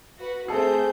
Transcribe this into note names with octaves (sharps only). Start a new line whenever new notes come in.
F#4 B4
A3 C4 G#4 A4 G6